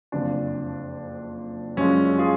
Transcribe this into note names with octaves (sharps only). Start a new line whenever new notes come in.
F#1 F2 F3 D4
F#2 F3 G#3 C#4
F4 G#4